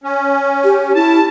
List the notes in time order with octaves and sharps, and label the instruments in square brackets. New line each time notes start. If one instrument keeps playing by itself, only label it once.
[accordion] C#4
[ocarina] G4
[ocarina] E4 [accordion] A5